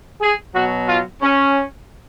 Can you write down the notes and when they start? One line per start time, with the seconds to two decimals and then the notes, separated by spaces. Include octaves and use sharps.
0.21 G#4
0.54 B2 F#3 F#4
0.87 F4
1.22 C#4